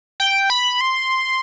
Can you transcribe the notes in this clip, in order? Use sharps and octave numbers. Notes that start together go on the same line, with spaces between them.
G5
B5
C6